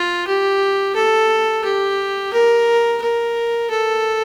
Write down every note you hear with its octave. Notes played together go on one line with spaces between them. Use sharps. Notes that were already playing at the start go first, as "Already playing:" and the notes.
Already playing: F4
G4
A4
G4
A#4
A#4
A4